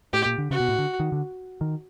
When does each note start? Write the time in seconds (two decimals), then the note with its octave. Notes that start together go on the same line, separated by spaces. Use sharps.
0.13 A2 G4
0.26 A#2
0.38 D3
0.51 C#3 F#4
0.60 B2
0.68 A2
0.78 D3
1.00 D#3
1.12 D3
1.61 D#3